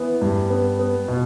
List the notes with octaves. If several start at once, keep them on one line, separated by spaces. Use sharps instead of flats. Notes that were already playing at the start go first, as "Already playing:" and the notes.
Already playing: E3 B3
G2
B3
B3
B2